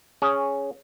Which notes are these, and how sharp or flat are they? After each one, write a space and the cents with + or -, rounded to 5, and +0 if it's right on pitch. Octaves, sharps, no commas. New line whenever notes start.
C#4 +0 G#4 +0